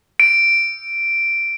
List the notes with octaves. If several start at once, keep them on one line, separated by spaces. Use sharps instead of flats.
D7